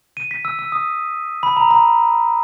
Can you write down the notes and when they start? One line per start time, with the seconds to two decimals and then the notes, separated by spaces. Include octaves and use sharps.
0.17 D#7
0.31 B6
0.45 E6
0.59 E6
0.72 D#6
1.43 B5
1.57 A#5
1.71 A#5